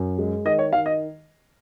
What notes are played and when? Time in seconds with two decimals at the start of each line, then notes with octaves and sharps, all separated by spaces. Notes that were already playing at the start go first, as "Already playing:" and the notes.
Already playing: F#2
0.18 G#3
0.45 D#3 D#5
0.59 C#5
0.73 D#3 F5
0.86 D#5